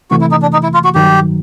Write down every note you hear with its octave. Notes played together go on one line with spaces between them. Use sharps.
C3 E3 A3 F#4
E4
D#4
D4
D#4
E4
F4
F#4
G2 D#3 F#3 G4